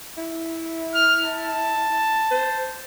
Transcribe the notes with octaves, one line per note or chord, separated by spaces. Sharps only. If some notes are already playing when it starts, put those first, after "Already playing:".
E4
F6
A5
C5